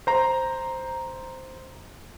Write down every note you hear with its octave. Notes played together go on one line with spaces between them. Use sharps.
C5 A#5